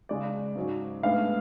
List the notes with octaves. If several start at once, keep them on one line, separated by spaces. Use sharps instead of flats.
C#3 G#3 C#4 D5
G#2 F#3 C#4
A2 G#3 B3 D4 F5